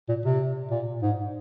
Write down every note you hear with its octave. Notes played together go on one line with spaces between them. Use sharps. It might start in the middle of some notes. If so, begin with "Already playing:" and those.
A#2
C3
A#2
G#2